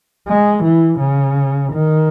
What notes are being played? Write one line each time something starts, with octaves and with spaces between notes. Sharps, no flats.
G#3
E3
C#3
D#3